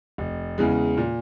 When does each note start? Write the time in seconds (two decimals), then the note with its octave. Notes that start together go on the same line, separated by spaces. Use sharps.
0.18 F1
0.58 E2 C#3 E3 G#3
0.97 A#2